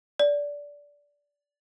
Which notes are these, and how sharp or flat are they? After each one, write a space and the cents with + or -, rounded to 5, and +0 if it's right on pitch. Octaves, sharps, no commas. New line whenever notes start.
D5 -15